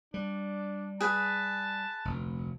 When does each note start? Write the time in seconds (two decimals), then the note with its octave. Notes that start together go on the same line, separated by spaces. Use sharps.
0.14 G3 D4
1.00 G#4 B4 A5
2.05 F1 D2